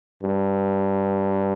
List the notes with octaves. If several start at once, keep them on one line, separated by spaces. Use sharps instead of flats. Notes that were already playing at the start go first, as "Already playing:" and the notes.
G2